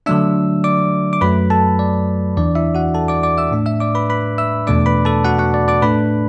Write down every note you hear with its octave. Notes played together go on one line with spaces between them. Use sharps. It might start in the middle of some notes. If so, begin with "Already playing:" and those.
D3 F#3 A3 D4 E5 E6
D5 D6
D6
F#2 F#3 A3 B4 B5
A4 A5
D5
E2 E3 D4 D5
E4 E5
F#4 F#5
A4 A5
D5 D6
D5 D6
E5 E6
A2 A3 D4
E5 E6
D5 D6
B4 B5
B4 B5
E5 E6
E2 B2 A3 D4 D5 D6
B4 B5
A4 A5
F#4 F#5
F#4 F#5
D5
D5 D6
A2 A3 D4 B4 B5